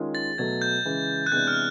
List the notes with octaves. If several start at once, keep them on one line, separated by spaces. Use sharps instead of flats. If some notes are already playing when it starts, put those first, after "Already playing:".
Already playing: D#3 G#3 C#4 F4 G#4
A6
B2 F#3 A3 G#6
G6
C#3 E3 G#3
F#6
C3 E3 G#3 B3 D4 G6
F6